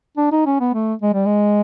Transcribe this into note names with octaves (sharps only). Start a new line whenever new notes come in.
D4
D#4
C#4
B3
A3
G#3
G3
G#3